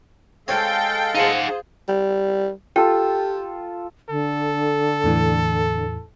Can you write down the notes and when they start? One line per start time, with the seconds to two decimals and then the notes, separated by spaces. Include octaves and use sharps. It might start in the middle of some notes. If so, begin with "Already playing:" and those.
0.48 G#3 C4 A4 C#5 F5 G5
1.15 D#4 F4 G#4 C5 F#5
1.88 G3
2.76 F4 G4 A4 G5
4.09 D3 A4
5.03 E2 A2 E3